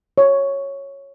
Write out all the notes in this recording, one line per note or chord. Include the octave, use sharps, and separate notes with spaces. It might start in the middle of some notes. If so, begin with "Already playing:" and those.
C#5